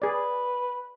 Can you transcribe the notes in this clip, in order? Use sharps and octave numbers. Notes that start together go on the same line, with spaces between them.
G#4 B4 D5